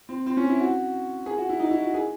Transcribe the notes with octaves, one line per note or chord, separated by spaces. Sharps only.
C4
C4
C#4
E4
F#4
G#4
F#4
E4
D#4
E4
F#4
G#4